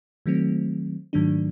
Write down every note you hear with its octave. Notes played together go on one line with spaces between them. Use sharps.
D#3 F#3 A3 C4
G#2 D#3 F#3 A3 D4